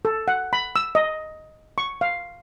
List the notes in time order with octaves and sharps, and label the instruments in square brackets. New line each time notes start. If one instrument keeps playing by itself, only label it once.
[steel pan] A4
F#5
B5
E6
D#5
C#6
F5